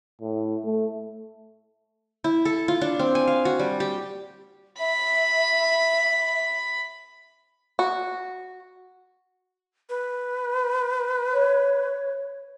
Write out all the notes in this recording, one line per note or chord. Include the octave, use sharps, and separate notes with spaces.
A2
A3
E4
A4
F4
D4
C4
G#5
F5
F#4
G3
G4
E5 B5
F#4
B4
C#5